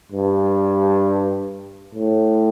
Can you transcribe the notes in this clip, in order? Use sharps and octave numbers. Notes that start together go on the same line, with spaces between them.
G2
A2